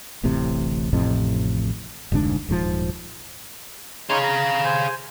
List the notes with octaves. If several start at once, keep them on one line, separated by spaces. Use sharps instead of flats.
D1 A1 A2 C3
A1 F2 A2 C3
F1 D2 G#2 D4
D#1 G#2 C3 F3
D#4 G#4 C#5 F5 C6
A#5
C5 G#5